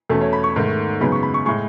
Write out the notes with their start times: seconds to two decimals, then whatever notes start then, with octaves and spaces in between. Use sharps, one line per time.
0.09 E2 B2 A3 C#4 A4
0.21 C#5
0.33 B5
0.44 C#6
0.56 G#2 D#3 A3
1.01 F#2 C#3 G#3 B3 D#4 B5
1.12 C#6
1.23 B5
1.34 C#6
1.46 A2 G#3 C#6